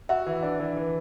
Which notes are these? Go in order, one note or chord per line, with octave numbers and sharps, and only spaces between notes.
F#4 E5
E3
D4
E3
E3